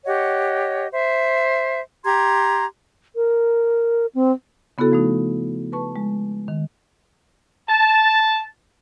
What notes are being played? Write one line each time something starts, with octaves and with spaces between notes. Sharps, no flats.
G4 C#5 D#5 F#5
C5 E5
G4 A#5 C6 G#6
A#4
C4
C#3 B3 E4 F#4 A4
F3 A3 D#4
B4 A5 C#6
G#3
D#3
A5